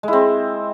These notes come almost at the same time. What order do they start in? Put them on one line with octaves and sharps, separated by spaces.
G#3 E4 C4